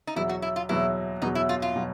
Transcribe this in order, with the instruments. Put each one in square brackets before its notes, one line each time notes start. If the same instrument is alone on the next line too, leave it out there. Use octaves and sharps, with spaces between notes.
[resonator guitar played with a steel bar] D#4
[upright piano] E2 B2 F#3 [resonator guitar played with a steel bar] E4
[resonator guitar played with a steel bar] F#4
E4
F4
[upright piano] E2 B2 F#3 [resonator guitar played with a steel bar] E4
[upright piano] E2 B2 F#3 [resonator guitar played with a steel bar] D#4
[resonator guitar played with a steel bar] E4
F4
F4
[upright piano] B2 F#3